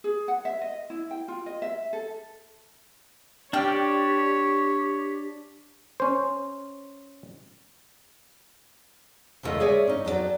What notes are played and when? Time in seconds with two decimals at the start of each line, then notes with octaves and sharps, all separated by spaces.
0.04 G#4
0.28 F#5
0.45 E5
0.61 D#5
0.90 E4
1.11 G5
1.28 F4
1.46 D#5
1.62 E5
1.93 A4
3.53 D4 G4 C#5 D5 G5 F6
6.00 C#4 C5
9.43 E2 C#3 G3 A3 F4 D#5
9.60 G#4 C#5 D5 E5 G#5
9.87 C#4 D#4
10.05 F2 F#3 G4 D5